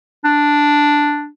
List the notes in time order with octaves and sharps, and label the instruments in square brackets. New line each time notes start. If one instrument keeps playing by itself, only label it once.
[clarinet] D4